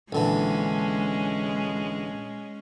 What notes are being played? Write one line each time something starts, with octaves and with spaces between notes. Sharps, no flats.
A#1 D3 E3 G#3 C#4